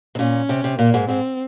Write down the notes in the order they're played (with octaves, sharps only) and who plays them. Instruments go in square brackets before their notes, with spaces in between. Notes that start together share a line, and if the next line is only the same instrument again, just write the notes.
[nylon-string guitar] C3
[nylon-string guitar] A#2 [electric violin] C#4
[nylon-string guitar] C3
C3
[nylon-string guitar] A#2 [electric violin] A#3
[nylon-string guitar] G#2
[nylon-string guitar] G#2 [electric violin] C4